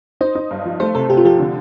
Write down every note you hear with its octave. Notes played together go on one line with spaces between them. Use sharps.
D#4 C5
D#4
G2
F3
A3 C5
C3 A4
C3 G4
F4
F3 G4
D3